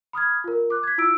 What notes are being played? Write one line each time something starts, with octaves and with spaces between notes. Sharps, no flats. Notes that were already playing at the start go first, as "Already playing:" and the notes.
B5 D#6 F6 G#6
F4 A#4
D6 F#6
G#6 B6
E4 F4 E6 D7